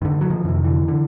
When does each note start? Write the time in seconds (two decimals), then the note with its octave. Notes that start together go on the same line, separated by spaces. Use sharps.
0.02 G2 D3 D#3
0.21 F#3
0.30 D#3 F3
0.45 F2 C3 E3
0.55 D#3
0.64 D3 E3
0.88 D3